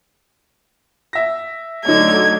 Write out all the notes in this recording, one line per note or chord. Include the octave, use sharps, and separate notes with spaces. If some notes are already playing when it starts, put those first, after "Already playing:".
E5 A#6
D3 F#3 A3 D#4 C#5 G#6